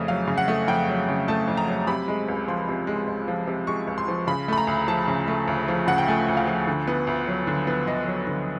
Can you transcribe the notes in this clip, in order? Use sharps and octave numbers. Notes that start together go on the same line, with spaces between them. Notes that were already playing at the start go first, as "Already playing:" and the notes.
Already playing: F2 C#3 A3
F#3 F5
C#3
F#5
A3
F2 G5
F#3
C#3
A3 A5
F2
A#5
F#3
C3 B5
G#3
C#2
F3 C6
C3
G#3
C#2
F3
C3
G#3 C#6
C#2
C6
F3
C#3 B5
A3 B5
A#5
D2
F3 A5
C#3
A3
D2
F3
C#3 F#5
G5
A3 G#5
D2
F5
F3
D3
B3
D2
F#3
D3
B3
D2 D#5
F#3
D3